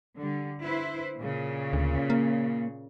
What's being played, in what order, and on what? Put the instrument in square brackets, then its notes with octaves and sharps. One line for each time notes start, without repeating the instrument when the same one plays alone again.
[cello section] D3 G3
E4 B4 C5
A#2 C#3
[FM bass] D2
A#3